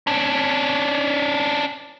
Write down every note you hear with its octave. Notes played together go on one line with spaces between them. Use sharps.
C#4 D4